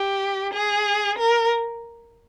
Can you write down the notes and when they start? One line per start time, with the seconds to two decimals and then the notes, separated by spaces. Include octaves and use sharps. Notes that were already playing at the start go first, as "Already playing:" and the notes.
Already playing: G4
0.53 G#4
1.18 A#4